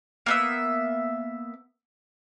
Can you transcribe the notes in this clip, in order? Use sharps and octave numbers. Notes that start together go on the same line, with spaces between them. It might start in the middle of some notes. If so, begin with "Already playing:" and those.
A#3 B3 E5